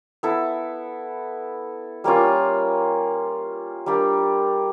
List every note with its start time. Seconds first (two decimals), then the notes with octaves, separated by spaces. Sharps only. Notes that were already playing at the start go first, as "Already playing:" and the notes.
0.23 B3 E4 A4
2.04 G3 A#3 C#4 F4
3.86 G3 A#3 D4 G4